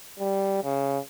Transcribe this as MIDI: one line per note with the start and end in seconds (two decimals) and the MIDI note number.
0.19 0.63 55
0.64 0.99 49